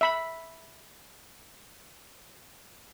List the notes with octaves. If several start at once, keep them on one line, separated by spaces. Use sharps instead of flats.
E5 B5